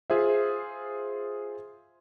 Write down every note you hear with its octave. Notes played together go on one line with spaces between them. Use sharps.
F4 G#4 C5 E5